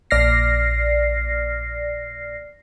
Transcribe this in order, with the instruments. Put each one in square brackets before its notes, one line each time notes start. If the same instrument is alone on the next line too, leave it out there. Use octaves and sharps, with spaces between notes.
[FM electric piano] A#1 D5 F6 A#6 C7